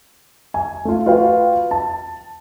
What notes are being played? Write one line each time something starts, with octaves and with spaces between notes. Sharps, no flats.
G#5
A3 F4
F4 F#4 B4 F5 G5
A5